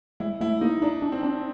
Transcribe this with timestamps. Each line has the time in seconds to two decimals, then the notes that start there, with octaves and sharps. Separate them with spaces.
0.20 G#3 E4
0.41 A3 E4
0.61 A#3 D#4
0.82 D4 D#4
1.02 D4
1.12 C4
1.23 D4